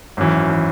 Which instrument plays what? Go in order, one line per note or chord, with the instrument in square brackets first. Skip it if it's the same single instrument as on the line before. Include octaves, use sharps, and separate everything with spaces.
[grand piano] G#1 F#2 E3
E3